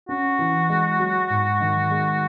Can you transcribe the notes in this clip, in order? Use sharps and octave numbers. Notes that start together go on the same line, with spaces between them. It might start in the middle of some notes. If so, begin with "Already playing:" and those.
C#4 F#4
E3
G#3
F#3
G#2
D#3
G#3